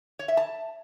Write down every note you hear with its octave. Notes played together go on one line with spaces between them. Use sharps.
C#5
E5
A5